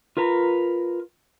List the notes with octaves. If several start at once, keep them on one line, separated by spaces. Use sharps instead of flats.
F4 A#4 B4 A#5